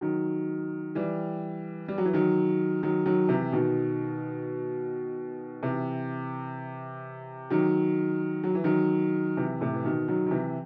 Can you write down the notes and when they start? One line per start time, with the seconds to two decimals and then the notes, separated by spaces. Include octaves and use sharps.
0.01 D#3 F#3
0.95 E3 G3
1.88 G3
1.98 F#3
2.05 E3
2.13 D#3 F#3
2.83 D#3 F#3
3.06 D#3 F#3
3.29 C3 E3
3.52 B2 D#3
5.63 C3 E3
7.50 D#3 F#3
8.44 F#3
8.55 E3
8.64 D#3 F#3
9.37 C3 E3
9.61 A2 C3
9.73 E3
9.85 B2 D#3
10.08 D#3 F#3
10.26 D#3
10.31 C3 E3